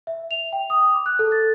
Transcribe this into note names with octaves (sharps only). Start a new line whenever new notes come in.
E5
F7
G5
D#6
D6
F#6
A4
A6